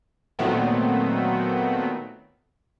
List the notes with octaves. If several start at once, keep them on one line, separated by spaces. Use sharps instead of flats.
A#2 D#3 F#3 A3 B3 C4